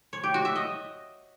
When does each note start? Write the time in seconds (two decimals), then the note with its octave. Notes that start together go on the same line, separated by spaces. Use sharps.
0.13 C#5
0.23 G4
0.34 F#4
0.45 E5
0.56 D#5